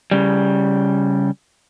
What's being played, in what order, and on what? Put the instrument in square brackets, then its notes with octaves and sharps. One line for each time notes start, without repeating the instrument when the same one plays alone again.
[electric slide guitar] C#3 G3